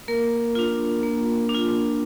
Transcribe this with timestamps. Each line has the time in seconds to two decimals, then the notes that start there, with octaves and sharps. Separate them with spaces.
0.08 A#3 A#4
0.55 D4 F4
1.03 A#3
1.49 D4
1.54 F4